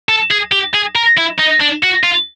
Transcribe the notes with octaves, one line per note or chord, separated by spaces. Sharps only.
A4
G#4
G4
G#4
A#4
E4
D#4
D4
F#4
F4